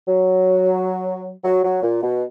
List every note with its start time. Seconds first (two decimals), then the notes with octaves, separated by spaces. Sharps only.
0.07 F#3
1.44 F#3
1.64 F#3
1.83 A#2
2.03 B2